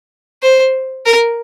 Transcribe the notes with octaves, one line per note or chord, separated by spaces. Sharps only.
C5
A#4